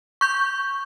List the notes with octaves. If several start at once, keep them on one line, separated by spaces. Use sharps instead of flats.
C#6 G6